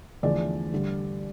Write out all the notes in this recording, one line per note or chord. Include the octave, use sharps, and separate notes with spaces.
E2 D3 F3 A3 D5
G2 D3 G3